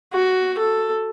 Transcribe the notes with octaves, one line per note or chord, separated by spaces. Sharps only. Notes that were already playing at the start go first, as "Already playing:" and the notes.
F#4
A4